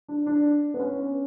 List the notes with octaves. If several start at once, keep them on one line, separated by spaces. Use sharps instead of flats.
D4
D4
B3
C#4